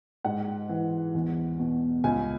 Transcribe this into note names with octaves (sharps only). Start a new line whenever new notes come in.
G#2 F#5
E3
E2
B2
C#2 G#5